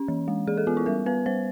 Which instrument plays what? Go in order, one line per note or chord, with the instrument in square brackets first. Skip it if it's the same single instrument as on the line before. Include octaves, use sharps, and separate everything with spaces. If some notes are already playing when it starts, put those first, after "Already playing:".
Already playing: [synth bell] C#4
E3
G#3
E3 G#4
A4
B3 F4
E4
G3 A#4
B3 B4
G3 C5